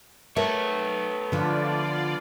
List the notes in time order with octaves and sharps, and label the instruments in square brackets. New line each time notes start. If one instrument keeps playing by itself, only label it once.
[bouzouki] A3 [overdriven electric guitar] B3 C#5 [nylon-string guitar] A#4
[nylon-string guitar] D3 F3 [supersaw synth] F4 D5